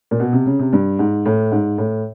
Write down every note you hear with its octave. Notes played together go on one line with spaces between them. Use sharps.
A#2
B2
C3
C#3
C3
G2
G#2
A2
G#2
A2